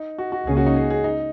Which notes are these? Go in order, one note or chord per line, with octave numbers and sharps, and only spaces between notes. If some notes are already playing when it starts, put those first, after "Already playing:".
Already playing: D#4
F#4
F#4
C#2 C#3 A#3 C#4 G#4
F#4
D#4
G#4
G#4
D#4